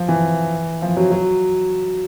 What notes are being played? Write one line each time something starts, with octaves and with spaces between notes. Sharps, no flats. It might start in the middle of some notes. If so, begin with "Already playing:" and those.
Already playing: F3
E3
F3
F#3
F#3